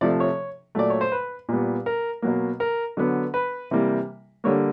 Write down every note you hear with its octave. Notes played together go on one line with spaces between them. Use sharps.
C3 F3 A3 D5
C#5
A#2 F#3 A3 D5
C#5
C5
B4
A#2 G3 B3
A#4
B2 F#3 A#3
A#4
D3 F#3 B3
B4
C3 E3 G3 A#3
D3 G3 A#3 C#5